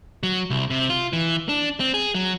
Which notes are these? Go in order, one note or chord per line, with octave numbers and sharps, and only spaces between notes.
F#3
C2
C3
F4
E3
D4
C4
G#4
F#3